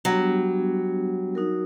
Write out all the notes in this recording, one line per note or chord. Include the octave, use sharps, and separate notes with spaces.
F#3 G3 B3 D4 G4
D#4 F#4 A#4